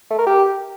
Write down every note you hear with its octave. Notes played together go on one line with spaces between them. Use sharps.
A3
A#4
G4